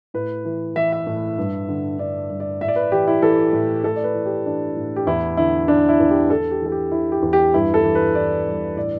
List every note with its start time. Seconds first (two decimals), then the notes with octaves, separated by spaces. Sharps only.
0.14 A2 B4
0.45 E3
0.75 E3 E5
0.92 E5
1.07 A2
1.38 G2
1.69 D3
1.99 D3 D5
2.30 G2
2.40 D5
2.61 A2 E5
2.68 D5
2.76 B4
2.92 E3 G4
3.07 E4
3.22 E3 A4
3.53 A2
3.84 A2 A4
3.96 D5
4.04 B4
4.14 E3
4.26 G4
4.46 E3 D4
4.77 A2
4.96 G4
5.07 E2 E4
5.37 D3 E4
5.68 D3 D4
5.89 E4
6.00 E2
6.10 G4
6.30 E2 A4
6.51 G4
6.61 E3 A4
6.72 G4
6.91 E3 E4
7.12 G4
7.23 E2
7.33 G4
7.54 G2 E4
7.74 A4
7.84 E3
7.95 B4
8.15 E3 D5
8.46 G2
8.77 A2 D5